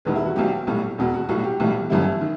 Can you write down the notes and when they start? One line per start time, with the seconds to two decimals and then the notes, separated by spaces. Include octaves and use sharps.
0.05 E1 E2 D#3 G3 B4
0.15 E4
0.26 F#4
0.36 B1 B2 F#3 G4
0.67 B1 A2 G3
0.98 E1 E2 B2
1.14 F#4
1.29 B1 A2 G3 F#4
1.44 G4
1.60 B1 A2 E3 G3
1.90 G1 F#2 E3 G3 E4
2.21 D#3